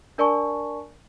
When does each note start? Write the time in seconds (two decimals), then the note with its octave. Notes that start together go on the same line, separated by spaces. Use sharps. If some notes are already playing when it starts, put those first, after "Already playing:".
0.18 D4 A#4 D5 G#5 A5 C#6